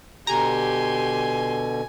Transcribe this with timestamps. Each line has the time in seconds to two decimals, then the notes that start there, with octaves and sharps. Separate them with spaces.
0.27 B2 D3 G4 G#5 A#5 C6